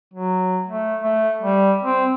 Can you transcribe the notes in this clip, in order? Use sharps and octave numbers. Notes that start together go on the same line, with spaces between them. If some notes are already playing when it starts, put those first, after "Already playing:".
F#3
A3
A3
G3
C4